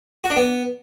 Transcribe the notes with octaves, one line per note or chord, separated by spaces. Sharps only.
F#4
D4
B3